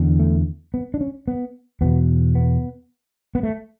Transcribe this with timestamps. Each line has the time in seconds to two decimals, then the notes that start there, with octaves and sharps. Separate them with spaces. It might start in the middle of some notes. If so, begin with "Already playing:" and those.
Already playing: E2 D3
0.19 A3
0.74 B3
0.94 D4
1.01 C#4
1.28 B3
1.81 E2 B2 B3
2.35 B3
3.35 B3
3.43 A3